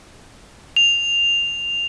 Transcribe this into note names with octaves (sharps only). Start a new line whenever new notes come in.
F7